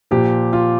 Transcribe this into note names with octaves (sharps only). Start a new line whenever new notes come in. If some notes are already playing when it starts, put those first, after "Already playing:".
A#2 F3 G4
F4